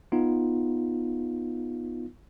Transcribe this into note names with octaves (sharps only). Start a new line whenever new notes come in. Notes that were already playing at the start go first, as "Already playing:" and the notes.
B3 D#4 F4